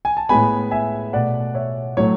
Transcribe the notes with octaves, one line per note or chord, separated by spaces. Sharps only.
G#5
A5
A2 G#3 B3 G#5 B5
E5 G#5
B2 A3 D5 F#5
C#5 E5
A2 F#3 A3 C#5